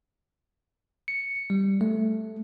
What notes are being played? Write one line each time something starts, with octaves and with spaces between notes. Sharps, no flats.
C#7
G3
A3